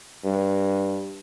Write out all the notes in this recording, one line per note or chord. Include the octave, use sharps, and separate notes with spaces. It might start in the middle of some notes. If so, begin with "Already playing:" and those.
G2